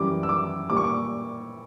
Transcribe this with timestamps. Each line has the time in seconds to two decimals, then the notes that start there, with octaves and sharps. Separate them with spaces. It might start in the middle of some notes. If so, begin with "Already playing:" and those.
Already playing: F#2 E3 G3 D6
0.23 E6
0.29 D6
0.70 A#2 G3 D6
0.77 C#6
0.84 D6